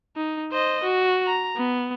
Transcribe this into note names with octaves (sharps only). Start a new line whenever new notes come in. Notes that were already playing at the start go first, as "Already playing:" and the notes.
D#4
C5 D#5
F#4
A#5
B3